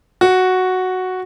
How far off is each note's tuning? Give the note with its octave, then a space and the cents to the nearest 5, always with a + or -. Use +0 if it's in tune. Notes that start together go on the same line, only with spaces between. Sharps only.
F#4 +0